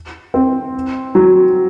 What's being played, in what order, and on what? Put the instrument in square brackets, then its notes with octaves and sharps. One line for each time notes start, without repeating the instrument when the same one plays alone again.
[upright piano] C4
F#3